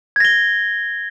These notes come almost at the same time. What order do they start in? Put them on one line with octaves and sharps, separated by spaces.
G#6 A#6 G7